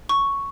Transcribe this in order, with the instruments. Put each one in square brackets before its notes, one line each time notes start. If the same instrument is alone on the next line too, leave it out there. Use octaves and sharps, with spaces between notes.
[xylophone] C#6